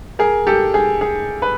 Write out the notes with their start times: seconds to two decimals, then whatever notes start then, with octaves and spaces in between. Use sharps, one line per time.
0.19 G#4 A#4
0.47 G4 A4
0.74 G#4
1.01 G#4
1.42 B4